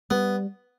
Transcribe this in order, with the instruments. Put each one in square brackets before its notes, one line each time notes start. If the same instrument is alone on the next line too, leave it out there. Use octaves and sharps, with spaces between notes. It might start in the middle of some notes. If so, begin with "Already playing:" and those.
[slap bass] G3 [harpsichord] B3